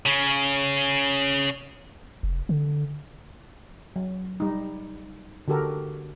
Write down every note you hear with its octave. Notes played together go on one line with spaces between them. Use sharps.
C#3 C#4
F1
D3
F#3
G3 D#4
D3 F#4 G4 A4 A#4